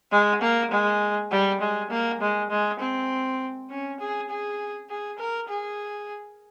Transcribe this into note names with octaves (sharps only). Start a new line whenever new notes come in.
G#3
A#3
G#3
G3
G#3
A#3
G#3
G#3
C4
C#4
G#4
G#4
G#4
A#4
G#4